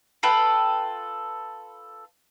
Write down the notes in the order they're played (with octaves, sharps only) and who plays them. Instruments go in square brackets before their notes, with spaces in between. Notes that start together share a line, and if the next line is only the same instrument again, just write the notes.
[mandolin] F4 A4 B4 G5